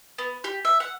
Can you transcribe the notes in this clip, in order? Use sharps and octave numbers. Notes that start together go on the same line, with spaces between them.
B3
G4
E5
F#5